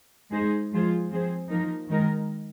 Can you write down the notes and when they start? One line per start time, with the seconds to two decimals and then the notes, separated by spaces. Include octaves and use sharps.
0.31 G#3 D#4 G#4 C5
0.71 F3 G#3 F4 G#4 C5
1.10 F3 C4 G#4 C5
1.50 F3 A#3 D#4 A#4
1.89 D#3 G#3 D#4 A#4